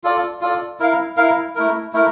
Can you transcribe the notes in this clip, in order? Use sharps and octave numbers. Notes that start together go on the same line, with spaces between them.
F4 A4 D5
F4 A4 D5
E4 A#4 F5
E4 A#4 F5
A3 E4 A#4
A3 E4 A#4